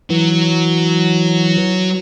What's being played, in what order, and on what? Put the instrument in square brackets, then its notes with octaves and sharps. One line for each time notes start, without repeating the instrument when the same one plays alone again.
[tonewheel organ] E3 [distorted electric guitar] F#3